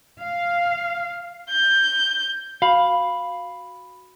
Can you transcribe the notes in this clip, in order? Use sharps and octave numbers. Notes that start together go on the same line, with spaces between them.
F5
G6
F#4 F5 B5 F#7